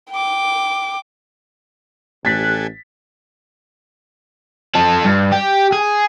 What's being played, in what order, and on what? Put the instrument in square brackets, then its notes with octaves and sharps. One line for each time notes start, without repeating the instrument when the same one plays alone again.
[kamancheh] G5 D6
[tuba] A1 [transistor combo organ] G4 A4 G#5 [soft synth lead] F#6 [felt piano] A6 B6
[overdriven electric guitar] F3 A4
G2
G4
G#4